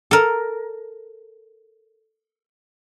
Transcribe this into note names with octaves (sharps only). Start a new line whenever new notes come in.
A4 A#4